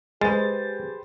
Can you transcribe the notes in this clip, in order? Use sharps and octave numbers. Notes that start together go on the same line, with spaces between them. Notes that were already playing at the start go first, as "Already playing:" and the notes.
G#3 G4 G#4 B4 C5 A6